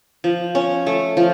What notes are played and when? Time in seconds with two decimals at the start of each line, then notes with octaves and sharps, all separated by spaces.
0.24 F3
0.55 C#4
0.87 A3
1.17 F3